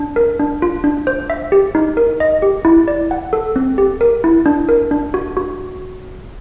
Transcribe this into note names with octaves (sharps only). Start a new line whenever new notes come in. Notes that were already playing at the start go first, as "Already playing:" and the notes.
Already playing: D4
A#4
D4
F4
D4
C5
E5
G4
D#4
A#4
D#5
G4
E4
D5
F#5
A4
C4
G4
A#4
E4
D4
A#4
D4
F#4
F#4